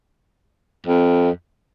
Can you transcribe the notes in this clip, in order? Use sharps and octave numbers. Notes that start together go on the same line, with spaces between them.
F2